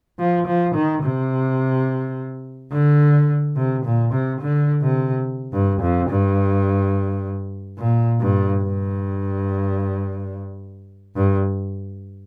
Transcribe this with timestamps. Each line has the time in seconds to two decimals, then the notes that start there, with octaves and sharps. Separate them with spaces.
0.19 F3
0.47 F3
0.75 D#3
1.03 C3
2.72 D3
3.56 C3
3.85 A#2
4.13 C3
4.41 D3
4.83 C3
5.53 G2
5.81 F2
6.10 G2
7.79 A#2
8.21 G2
8.63 G2
11.16 G2